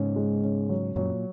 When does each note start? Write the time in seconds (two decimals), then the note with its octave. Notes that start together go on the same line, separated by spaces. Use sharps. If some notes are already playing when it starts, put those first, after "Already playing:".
Already playing: G#2 C#3 C#4
0.16 G#3
0.44 C#4
0.69 F#3
0.96 F#2 A#2 F#3